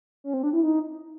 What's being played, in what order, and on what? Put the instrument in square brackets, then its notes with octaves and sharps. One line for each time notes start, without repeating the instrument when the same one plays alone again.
[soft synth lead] C#4
C4
D4
E4
D#4